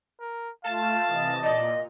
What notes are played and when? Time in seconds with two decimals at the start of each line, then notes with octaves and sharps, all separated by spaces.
0.21 A#4
0.65 A3 F4 F5 A5
1.07 C3 E3 D#5
1.43 A#2 D5 D#5